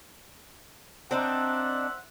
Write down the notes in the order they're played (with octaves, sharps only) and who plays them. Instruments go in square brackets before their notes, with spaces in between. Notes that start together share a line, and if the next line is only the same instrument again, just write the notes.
[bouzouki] C4 D4 D#4 [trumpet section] C5 E5 F#5